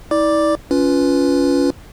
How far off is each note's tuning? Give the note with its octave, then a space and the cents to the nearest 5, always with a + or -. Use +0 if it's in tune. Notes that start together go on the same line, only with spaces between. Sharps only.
E4 -45 D5 +0 D6 +0
C#4 +20 F4 +0 B4 +0